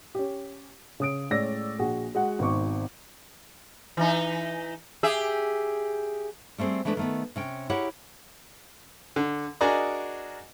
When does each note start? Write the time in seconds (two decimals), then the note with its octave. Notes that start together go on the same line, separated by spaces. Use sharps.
0.15 C#4 G4
1.00 C#3 D#6 D7
1.31 A2 G#3 C#4 D5 E6 A#6
1.79 A#1 F#4 G#4
2.15 G#3 F#4 F#5
2.39 G#1 B2 D#3 C4 C#6 D6
3.97 E3 D#4
5.03 G4 G#4 E5
6.58 G3 A3 B3 C4 G#4
6.85 E3 G#3 A3 D4 B4
6.97 D#3 A3 B3
7.36 C3 C#4 G5
7.70 E4 G4 G#4 A#4 C#5 F#5
9.16 D3
9.61 D4 F#4 G#4 A#4 D5 D#5